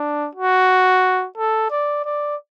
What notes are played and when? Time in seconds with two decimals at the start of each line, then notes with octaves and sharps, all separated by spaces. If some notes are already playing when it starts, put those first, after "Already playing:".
Already playing: D4
0.35 F#4
1.38 A4
1.71 D5
2.05 D5